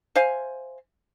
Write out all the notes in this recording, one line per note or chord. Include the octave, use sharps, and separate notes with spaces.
C5 E5 F5 G#5